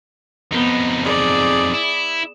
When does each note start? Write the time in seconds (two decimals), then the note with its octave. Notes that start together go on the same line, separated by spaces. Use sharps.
0.52 F2 B3 D#4
1.04 G#4 D5
1.74 E4